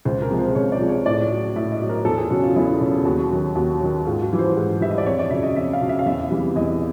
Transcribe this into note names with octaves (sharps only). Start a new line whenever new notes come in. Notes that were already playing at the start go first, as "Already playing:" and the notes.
C#2 C5
A#4
C3 F3 G#3
C5
C#2 C#5
D5
C3 F3 G#3
C#5
A2 D5
F#3
A2 E5
D#5
F#3
A#4
E2 A4
G#4
C#3 F#3 F#4
F4
E2 E4
C#3 F#3
D#2 F#4
D#3 F#3
D#2 F#4
D#3 F#3
G#2 F4
F#4
E3 G3
C5
G#2
E3 G3 E5
D#5
D5
F2 C#5
D5
C#3 F#3 E5
D#5
F2 E5
F5
C#3 F#3
E5
F5
E2 E5
C3 E3 G3
E2 D#5